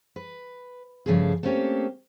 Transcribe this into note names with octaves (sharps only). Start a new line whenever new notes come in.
B4
G2 C#3 F3 A3 F4 G#4
A3 A#3 C4 C#4 G4 A4